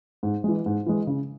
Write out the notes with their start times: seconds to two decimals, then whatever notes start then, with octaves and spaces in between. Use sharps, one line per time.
0.23 G#2
0.44 E3 G#3
0.66 G#2
0.86 E3 G#3
1.07 C#3